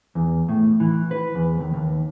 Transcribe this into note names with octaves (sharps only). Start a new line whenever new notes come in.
E2
A2
E3
B4
E2
D#2
D#2